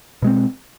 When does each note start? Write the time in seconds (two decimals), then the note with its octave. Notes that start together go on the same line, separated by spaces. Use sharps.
0.22 B2 G#3 C4